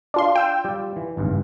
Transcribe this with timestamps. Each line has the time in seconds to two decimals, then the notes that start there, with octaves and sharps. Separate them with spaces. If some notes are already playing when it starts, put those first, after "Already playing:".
0.14 D4 F4 C6
0.36 G5 E6
0.64 G3 F4 D5
0.96 E3
1.17 G#1 C#2 G2